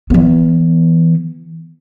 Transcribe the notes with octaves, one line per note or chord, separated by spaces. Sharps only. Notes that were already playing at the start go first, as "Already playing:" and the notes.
E3 B3